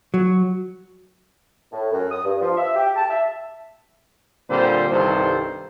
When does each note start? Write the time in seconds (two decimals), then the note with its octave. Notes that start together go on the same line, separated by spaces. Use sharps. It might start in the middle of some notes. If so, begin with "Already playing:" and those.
0.14 F#3
1.72 A2
1.92 F#2
2.11 D#6
2.24 G2
2.41 F3
2.57 E5
2.75 G4
2.96 A5
3.10 E5
4.49 A#2 D3 G3 C4 C5
4.90 C2 G2 D#3 A4 C5